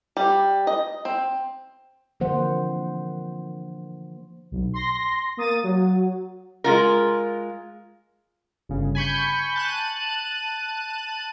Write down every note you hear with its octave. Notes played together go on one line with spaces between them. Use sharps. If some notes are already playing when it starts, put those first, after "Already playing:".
G3
D#5
C4
D3 E3 F3 A#3 C5 F#5
B1
C6 A#6
A#3 D#6 A6 D#7
F#3
G#3 F4 A#4
G1 C#3
G#5 B5 C#6 G6
A5 F#6 D#7